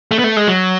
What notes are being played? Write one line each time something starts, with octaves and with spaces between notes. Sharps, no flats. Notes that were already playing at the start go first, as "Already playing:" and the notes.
A3
B3
A3
G#3
F#3